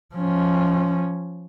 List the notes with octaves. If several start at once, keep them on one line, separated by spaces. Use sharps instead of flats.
F3 C#4